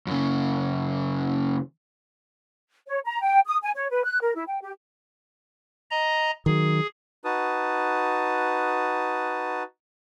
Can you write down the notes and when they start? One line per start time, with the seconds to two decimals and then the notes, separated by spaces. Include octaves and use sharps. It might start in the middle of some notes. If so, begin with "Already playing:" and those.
0.07 F#2 C#3
2.88 C#5
3.05 A#5
3.23 G5
3.47 D#6
3.62 G#5
3.75 C#5
3.90 B4
4.04 F#6
4.21 A#4
4.35 E4
4.48 G5
4.62 G4
5.91 D#5 A#5
6.46 D#3 F#3 G#4
7.25 D#4 F#4 B4 A5 D#6